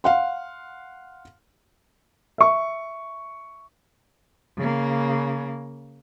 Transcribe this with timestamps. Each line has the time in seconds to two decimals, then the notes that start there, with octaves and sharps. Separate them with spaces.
0.04 F5 F#5 C6
2.38 E5 C#6
4.58 C#3 A#3